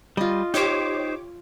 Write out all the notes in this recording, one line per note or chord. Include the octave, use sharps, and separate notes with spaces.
G3 F4 D#5
D#4 G4 C5 C#5 D6